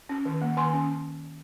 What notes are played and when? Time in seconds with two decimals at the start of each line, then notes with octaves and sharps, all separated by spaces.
0.09 C#4
0.25 D#3
0.41 A#3
0.57 D#3 G#5 C6
0.73 C#4